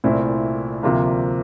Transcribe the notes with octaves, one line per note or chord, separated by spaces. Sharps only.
C2 A#2 A3 C4 E4
D2 C3 F3 A#3 F4